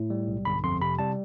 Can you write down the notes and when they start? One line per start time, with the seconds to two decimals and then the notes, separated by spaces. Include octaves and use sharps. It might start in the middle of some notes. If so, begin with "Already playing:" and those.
Already playing: A2
0.10 G3
0.28 B1
0.45 G1 B5
0.64 F2 C6
0.81 C3 B5
0.99 G3 A5